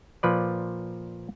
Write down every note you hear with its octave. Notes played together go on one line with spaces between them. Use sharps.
A#2 F3 B4 D5